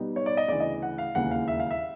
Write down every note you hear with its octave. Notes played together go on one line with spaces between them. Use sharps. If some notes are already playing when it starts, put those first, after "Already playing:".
Already playing: B2 G3 B3 D#4
C#5
D5
D#5
D2 C#3 E3 D5
D#5
F#5
F5
E1 D#2 C#3 E3 F#5
F5
E5
F5
E5